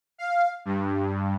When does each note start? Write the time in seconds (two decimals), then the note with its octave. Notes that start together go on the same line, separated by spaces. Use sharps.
0.18 F5
0.65 G2